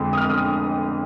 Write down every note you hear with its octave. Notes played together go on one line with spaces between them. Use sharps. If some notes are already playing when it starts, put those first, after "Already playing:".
Already playing: F2 D3 G#3
D#6
F6
D#6